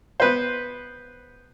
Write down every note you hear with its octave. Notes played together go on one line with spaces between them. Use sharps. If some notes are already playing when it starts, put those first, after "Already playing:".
B3 B4 C5